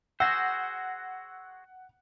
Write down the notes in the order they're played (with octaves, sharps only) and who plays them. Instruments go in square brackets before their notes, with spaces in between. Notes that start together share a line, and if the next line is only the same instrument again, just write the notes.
[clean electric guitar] F#4 G#4 C5 [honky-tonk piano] F#5 [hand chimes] E6 A#6